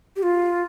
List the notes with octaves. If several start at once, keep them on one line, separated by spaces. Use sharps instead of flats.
G4
F4